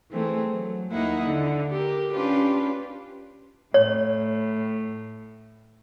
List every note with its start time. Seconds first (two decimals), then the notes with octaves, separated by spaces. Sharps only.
0.11 E3 A3 C4 G#4
0.48 F#3
0.91 D#2 A#3 D#4 E4 F#5
1.26 D3
1.71 G4 A#4
2.13 C#4 D4 F4 G4 B4
3.74 A2 C#5